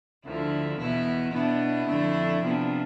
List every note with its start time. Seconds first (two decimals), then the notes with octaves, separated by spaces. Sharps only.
0.25 D2 D3 F3 E4
0.78 E2 B2 B3 E4
1.33 B2 B3 D4 E4
1.87 F2 D3 A3 D4
2.41 C3 F3 B3 D4